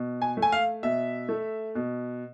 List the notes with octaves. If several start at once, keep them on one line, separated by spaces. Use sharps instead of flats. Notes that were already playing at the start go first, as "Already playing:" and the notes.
Already playing: B2
G#5
A3
G#5
F5
B2 E5
A3
B2